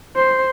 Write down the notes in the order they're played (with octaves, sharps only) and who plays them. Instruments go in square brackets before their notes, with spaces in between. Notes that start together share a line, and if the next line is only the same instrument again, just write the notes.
[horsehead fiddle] C5